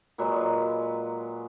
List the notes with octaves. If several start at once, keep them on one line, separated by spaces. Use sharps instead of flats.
A#2 F#3 G#3 B4